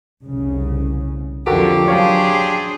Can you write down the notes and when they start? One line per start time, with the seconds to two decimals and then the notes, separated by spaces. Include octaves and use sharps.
0.24 F1 C2 C#3
1.47 F2 D3 F3 F#4 G4 A4 A#4
1.88 F#3 D4 G#4 C5 C#5 F5 A5